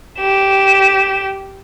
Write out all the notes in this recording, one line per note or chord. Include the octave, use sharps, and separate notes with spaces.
G4 E7